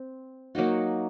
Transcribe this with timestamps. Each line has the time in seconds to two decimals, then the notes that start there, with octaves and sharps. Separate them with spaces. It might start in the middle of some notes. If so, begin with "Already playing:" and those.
Already playing: C4
0.55 F#3 A#3 D#4 F#4